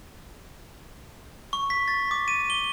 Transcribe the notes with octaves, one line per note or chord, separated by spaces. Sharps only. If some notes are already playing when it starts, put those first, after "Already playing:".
C#6
B6
A6
D6
D#7
G7